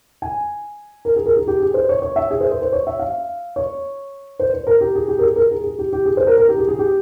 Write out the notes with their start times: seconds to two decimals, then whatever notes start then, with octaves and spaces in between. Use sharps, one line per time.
0.22 G#5
1.05 A#4
1.16 G#4
1.26 A#4
1.37 G#4
1.47 G4
1.60 G#4
1.74 C5
1.89 C#5
2.02 C#5
2.16 E5
2.31 G#4
2.41 C5
2.51 C5
2.62 C5
2.73 C#5
2.87 E5
2.99 F5
3.56 C#5
4.40 C5
4.54 C5
4.67 A#4
4.81 G4
4.96 G#4
5.08 G4
5.19 A#4
5.22 G#4
5.36 A#4
5.51 G#4
5.64 G#4
5.79 G4
5.93 G4
6.06 G#4
6.17 C5
6.27 A#4
6.38 A#4
6.49 G4
6.58 G#4
6.68 G#4
6.79 G4